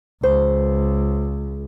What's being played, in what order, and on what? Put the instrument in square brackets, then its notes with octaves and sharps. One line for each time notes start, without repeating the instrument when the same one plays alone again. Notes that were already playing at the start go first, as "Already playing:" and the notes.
[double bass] C#2 [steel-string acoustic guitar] C5